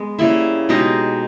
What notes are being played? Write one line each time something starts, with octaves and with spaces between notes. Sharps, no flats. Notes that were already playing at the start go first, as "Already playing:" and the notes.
Already playing: G#3 B3
C#3 G3 A#3 E4
B2 G#3 D#4 G4